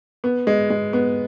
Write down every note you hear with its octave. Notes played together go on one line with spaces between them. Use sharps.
B3
G#3
G#3
B3